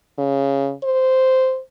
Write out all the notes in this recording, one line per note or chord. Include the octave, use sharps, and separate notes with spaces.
C#3
C5